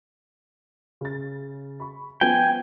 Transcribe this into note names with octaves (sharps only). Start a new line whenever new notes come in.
C#3 A6
B5 C#6
F3 B3 G5 G#5